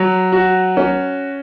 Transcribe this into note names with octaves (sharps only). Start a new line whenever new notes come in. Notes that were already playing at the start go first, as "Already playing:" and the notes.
Already playing: F#3
F#4
C#4